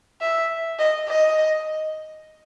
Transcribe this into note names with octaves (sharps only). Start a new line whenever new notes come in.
E5
D#5
D#5